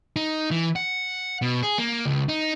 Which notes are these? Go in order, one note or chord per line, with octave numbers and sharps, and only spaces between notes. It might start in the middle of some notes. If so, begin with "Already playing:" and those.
D#4
E3
F#5
B2
G#4
A#3
C#2
D#4